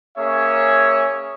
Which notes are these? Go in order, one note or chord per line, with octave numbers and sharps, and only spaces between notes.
A#3 C#4 G#4 C#5 E5